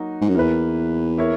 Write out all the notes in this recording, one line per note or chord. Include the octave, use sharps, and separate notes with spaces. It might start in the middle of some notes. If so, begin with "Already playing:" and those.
Already playing: F#3 A#3 D#4 F#4
G#2
F#2
E2 A#3 E4 B4
A#3 E4 A#4 C#5